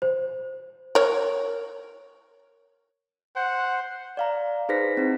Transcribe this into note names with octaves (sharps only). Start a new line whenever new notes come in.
C5
A#4 C#5
C5 F#5
D5 F5 A#5
D#4 G#4 B4 C5 A#6 B6
C4 D#4 E4